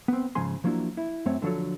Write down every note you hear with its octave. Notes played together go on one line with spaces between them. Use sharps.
B3 C4
G#2 C#3 F3 G#5 C6
F3 F#3 A#3 D4 E4
E4
F#2 A3 C4 C#5
D3 F3 F#3 A4 C#5